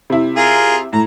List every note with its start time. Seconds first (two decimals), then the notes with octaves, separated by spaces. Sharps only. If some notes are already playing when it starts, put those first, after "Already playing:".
0.10 C3 E4
0.37 F4 G#4 A#4
0.93 A2 A#5